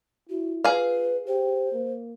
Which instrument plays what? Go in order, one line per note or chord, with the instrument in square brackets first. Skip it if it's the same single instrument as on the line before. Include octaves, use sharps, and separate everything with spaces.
[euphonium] E4 [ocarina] F#4
[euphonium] F4 [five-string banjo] G#4 F5 [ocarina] B4
[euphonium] G4 [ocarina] C5
[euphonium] A#3